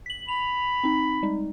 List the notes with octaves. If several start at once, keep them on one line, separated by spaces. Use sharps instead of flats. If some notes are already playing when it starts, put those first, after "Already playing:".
B6 F#7
B5 F7
C4 D#4
G3 G#3 D#4